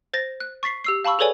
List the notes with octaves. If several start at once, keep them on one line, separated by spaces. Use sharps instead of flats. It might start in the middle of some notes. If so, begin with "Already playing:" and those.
C5 A6 A#6
F#6
C#6 A6 B6 C7
G4 E6 C7
F5 A5 B5 C#6 E6
G#4 A4 B4 C#5 D5 G#5